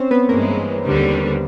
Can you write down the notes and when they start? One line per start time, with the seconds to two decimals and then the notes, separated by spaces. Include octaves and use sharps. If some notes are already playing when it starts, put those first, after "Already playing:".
Already playing: C4 C#4 C5 C#5
0.11 B3 B4
0.29 G2 E3 G#3 A#3 A#4
0.84 D#2 D3 G3